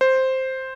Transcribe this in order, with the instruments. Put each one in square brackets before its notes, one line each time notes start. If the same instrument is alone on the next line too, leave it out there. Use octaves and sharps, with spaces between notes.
[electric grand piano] C5